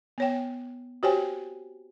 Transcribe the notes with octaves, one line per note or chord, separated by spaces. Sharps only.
B3 C#5 G5
F#4 G4 C5 C#5 G5 G#5